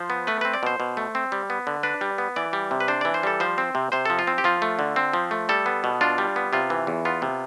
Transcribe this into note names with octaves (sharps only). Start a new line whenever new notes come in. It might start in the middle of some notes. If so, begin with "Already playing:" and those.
Already playing: F3 C5
B3
A3 B4
C4 B4
D5
B2 C5
B2
A3
C4
G3
B3
D3
D4 B4
G3
B3
E3 D5
G3
C3
B4
D4 C5
E3 D5
C5
G3 A4
F3 C5
C4
C3
C3 C5
F3 A4
F4
C4
G4
F3 F4
A3
D3
C4
F3
A3
G3 A4
B3
B2
D4 F4
G3
B3
C3 F4
E3
E2
B3 F4
C3